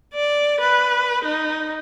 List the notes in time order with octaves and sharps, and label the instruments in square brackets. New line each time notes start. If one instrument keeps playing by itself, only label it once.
[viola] D5
B4
D#4